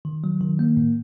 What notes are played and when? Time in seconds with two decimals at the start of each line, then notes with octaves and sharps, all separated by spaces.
0.05 D#3
0.24 F#3
0.41 D#3
0.59 A#3
0.77 A2